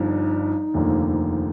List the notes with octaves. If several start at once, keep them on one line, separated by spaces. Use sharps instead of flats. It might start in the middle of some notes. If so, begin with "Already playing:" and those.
Already playing: G1 G2 F3 D#4
F1 D#2 D3 F3 A#3